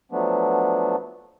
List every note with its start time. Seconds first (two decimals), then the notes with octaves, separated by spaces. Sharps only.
0.12 F3 F#3 A3 B3 D4